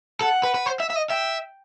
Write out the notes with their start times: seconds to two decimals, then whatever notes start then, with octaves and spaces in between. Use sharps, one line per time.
0.21 A4 F#5
0.43 B4
0.54 B4
0.66 C5
0.80 E5
0.90 E5
0.96 D#5
1.10 E5 G5